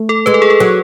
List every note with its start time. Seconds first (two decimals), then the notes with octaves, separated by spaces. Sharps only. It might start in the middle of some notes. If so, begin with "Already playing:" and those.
Already playing: A3
0.09 A4
0.26 G#3 B4
0.34 A4
0.42 G#4
0.50 A4
0.60 F#3